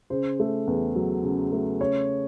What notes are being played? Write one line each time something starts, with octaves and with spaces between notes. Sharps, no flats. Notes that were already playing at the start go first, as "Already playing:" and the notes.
C#3 C5
A3
E2
F#3
C#3
A3
C#3 C#5